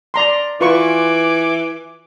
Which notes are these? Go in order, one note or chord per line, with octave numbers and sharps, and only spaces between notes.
D5 A#5 C6
E3 F4 B4 G#5 C#6 D6